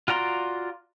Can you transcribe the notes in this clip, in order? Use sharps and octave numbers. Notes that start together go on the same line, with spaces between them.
F4 F#4 D5 A#5 C6